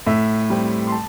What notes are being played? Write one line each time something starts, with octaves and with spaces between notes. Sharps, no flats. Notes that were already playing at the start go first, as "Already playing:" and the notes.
A2 E5
G3 C4
C6
A5